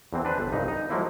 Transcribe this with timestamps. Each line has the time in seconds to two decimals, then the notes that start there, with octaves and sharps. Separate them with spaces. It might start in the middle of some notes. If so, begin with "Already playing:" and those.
0.13 E2 E3 C4
0.25 D4 B4 C5
0.38 G1
0.52 C2 G2 D#4
0.68 D#4
0.90 F3 F#3 G#3 A#3 E4